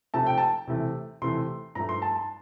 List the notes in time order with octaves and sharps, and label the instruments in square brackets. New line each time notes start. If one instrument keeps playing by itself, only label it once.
[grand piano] C3 F3 A3 A5
G5
A5
C3 E3 A3
C3 E3 A3 C6
G2 F3 A3 A#5
C6
A5
A5